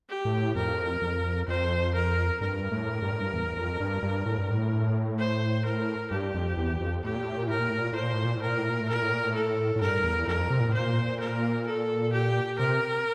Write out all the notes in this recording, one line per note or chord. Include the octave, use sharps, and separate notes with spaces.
G4
A2
F2 A#4
F2
F2 C5
A#4
G2 A#4
A2
G2
A2
G2
E2
F2
G2
G2
A2
G2
A2
C5
A#4
G2 G4
F2
E2
F2
A2 G4
A#2
A2
A#2
A2 A#4
A#2
A2
A#2
A2 C5
A#2
A2
A#2
A2
A#4
A#2
A2
A#2
A2
A#2 A#4
A2
A#2
A2
A4
A2
G2 A#4
E2
F2 A#4
C3
A#2
A2
A#2 C5
A#4
A4
G4
C3 A#4